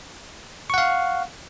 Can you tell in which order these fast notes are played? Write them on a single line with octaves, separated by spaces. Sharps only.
C#6 F#5 F5